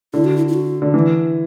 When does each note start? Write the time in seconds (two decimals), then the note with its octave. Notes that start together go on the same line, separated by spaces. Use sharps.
0.14 D3 E4
0.24 F#4
0.37 E4
0.48 E4
0.54 F#4
0.82 D3
0.94 E3